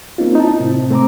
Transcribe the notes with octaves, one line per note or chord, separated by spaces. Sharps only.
A#3 C4 C#4 D#4 F4
D#4 E4 A5
A2 C3 C4
A3 C4 A#5 D6